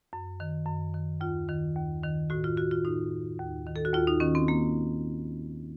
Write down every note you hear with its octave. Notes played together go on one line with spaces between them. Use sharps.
F#2
D#3
F#2
D#3
D#2 F4
D#3
D#2
D#3
A2 F#4
F4
F#4
F4
A2 D#4
D#2
D#3
A4
F#4
D#2 F4
D#4
D#3 C#4
C4
A#3